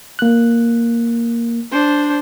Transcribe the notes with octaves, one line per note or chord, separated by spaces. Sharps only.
A#3 F#6
D4 C5